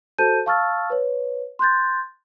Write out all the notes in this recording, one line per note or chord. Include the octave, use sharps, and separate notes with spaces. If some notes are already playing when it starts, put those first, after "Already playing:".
F#4 A4 C5 A5 G6 D#7
F5 A5 C#6 E6 F6 A6
B4 C#5
C6 F#6 G6 A6